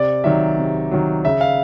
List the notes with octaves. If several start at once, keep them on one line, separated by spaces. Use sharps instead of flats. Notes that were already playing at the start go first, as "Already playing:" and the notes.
Already playing: C3 D5
D#3 F#3 E5
C3
D#3 F#3
C#3 E5
F5